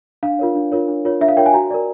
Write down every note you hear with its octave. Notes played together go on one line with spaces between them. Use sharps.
D4 F5
F4 A#4 C#5
D4
F4 A#4 C#5
D4
F4 A#4 C#5
D4 E5
F5
F4 A#4 C#5 G5
G#5
F#4 A#5
A#4 D5